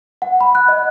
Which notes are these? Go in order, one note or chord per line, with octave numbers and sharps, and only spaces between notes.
F#5
B5
F#6
D#5